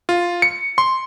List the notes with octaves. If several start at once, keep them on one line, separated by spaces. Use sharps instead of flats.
F4
C#7
C6